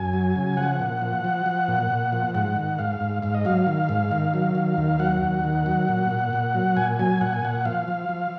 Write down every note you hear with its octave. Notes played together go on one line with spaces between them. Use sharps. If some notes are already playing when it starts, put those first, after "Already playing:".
Already playing: F#2 G#5
F#3
C#3
F3 F#5
A#2
F3
F3
F3
A#2
A#2
F3
G#2 F#5
D#3
G#2 F5
G#2
G#2 F5
D#5
F#3 F5
D#3
G#2
D#3
F#3
D#3
D#2
F#3 F#5
D#2
D#3
F#3
A#2
A#2
A#2
F#3
A#2 G#5
F#3 G#5
A#2 F#5
G#5
A#2 F#5
F3 F5
F3
F3